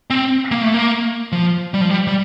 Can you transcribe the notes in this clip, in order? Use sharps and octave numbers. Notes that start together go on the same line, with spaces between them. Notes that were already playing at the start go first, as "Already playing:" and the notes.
C4
A#3
A3
A#3
F3
G3
F3
G3
G3